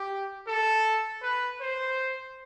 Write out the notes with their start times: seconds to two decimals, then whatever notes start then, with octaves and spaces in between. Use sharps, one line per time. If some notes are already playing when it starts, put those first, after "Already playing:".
Already playing: G4
0.47 A4
1.23 B4
1.61 C5